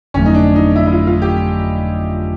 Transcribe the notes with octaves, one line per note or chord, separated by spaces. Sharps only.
G1 F2 D3 F#3 A3 C#4
D#4
D4
D#4
E4
E4
F4
F4
G4